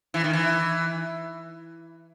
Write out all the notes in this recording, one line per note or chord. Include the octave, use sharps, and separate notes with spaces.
E3
D#3
E3